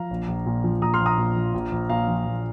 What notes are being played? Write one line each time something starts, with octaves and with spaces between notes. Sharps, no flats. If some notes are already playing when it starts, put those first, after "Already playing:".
Already playing: F3 F5 A#5
A#1
A#1
A#2
F3
A#1 A#5 D#6
C6 F6
A#1
A#5 D#6
A#2
F3
A#1
A#1
A#2 F5 A#5
F3
A#1